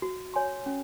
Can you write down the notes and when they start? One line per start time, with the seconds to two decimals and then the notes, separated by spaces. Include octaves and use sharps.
0.02 F#4
0.34 C#5 G#5 C6
0.66 C#4